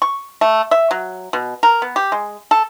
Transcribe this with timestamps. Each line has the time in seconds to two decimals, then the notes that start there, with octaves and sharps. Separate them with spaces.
0.02 C#6
0.41 A3
0.71 E5
0.91 F#3
1.33 B2
1.63 A#4
1.82 B3
1.96 G4
2.12 G#3
2.51 A4